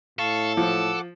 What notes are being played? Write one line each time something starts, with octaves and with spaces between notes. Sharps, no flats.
A2 A4 F5 A5 C#6
F3 F#5 D6